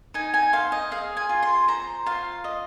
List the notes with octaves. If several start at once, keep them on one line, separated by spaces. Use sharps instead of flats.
D#4 G#5
G#5
C5 F5
D#5
G#4 F5
G#5
F4
C6
C5 A#5
F4 F5
D#5